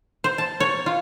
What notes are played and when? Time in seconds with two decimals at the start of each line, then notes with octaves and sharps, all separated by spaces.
0.24 C5
0.38 A5
0.60 C#5
0.86 F4